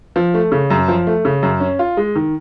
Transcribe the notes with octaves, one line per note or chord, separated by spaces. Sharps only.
F3
A3
C#3
F#2
F3
A3
C#3
F#2
C#4
F4
G#3
D#3